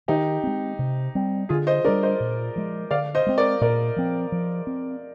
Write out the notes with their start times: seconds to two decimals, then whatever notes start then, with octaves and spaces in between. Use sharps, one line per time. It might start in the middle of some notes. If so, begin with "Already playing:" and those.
0.08 D#3 D#4 G4
0.44 G#3 C4
0.79 C3
1.15 G3 C4
1.49 D3 F4 G#4
1.67 C5 D#5
1.85 G3 A#3 D4 A#4 D5
2.03 C5 D#5
2.20 A#2
2.56 F3 G#3
2.91 D3 D5 F5
3.15 C5 D#5
3.26 G#3 C4
3.38 A#4 D5
3.61 A#2 A#4 D5
3.96 F3 C4
4.32 F3
4.67 C4